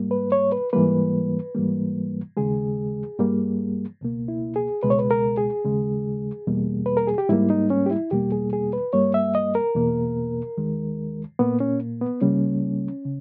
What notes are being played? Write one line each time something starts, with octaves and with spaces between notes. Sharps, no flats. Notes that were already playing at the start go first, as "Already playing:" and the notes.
Already playing: G#2 G3 A#3
B4
C#5
B4
G#2 E3 G3 A#3 B4
G#2 E3 G3 A#3
D#2 C#3 G#3 G#4
G2 G3 A#3
C#2 B2 A#3
E4
G#4
C#2 B2 G#3 B4
C#5
B4
A#4
G#4
D#2 C#3 G#3
E2 B2 G3 A#3
B4
A#4
G#4
G4
G#2 G3 A#3 E4
D#4
C#4
G4
E4
E2 B2 G3 A#3 G4
G#4
G#4
B4
G2 G3 A#3 C#5
E5
D#5
A#4
E2 B2 A#3
D#2 D#3 G#3
A#2 A#3 B3
C#4
B3
C#2 C#3 G3 A#3 C#4
C#3